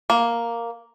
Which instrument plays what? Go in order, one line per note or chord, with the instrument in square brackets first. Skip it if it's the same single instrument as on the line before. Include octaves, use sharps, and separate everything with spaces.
[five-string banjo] A#3